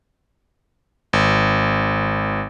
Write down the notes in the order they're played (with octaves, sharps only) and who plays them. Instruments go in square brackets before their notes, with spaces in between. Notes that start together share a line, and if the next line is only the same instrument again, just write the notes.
[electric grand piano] G#1